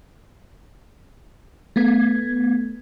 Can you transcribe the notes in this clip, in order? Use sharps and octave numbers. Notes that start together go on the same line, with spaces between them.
A3 B3 G#6